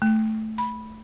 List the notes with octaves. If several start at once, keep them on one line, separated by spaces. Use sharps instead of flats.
A3
B5